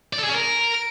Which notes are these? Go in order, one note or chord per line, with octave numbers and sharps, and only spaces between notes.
D5
A4
G#4
C#4
A#4